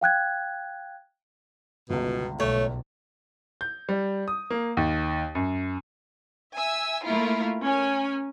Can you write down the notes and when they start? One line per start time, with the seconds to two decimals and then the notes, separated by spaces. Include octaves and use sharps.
0.01 F5 G5 F#6 G#6
1.90 G1 C#2 B2
2.40 B1 A3 C#5
3.61 G6
3.89 G3
4.28 D#6
4.50 A#3
4.77 D#2
5.35 F#2
6.54 E5 G#5 E6
7.04 A3 A#3 E4 F4 A#4
7.61 C#4 A#4 G#5